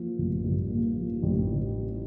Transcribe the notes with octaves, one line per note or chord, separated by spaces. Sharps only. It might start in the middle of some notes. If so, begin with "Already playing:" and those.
Already playing: F3 A#3
A1
G2
A#3
F3
A1